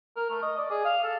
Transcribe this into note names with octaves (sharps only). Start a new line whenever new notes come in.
A#4
A3
D#5
D5
G#4
F5
A4